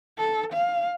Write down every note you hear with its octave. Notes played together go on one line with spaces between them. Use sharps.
A4
F5